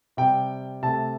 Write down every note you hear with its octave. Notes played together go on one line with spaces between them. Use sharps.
C3 G3 G5
C3 A3 A5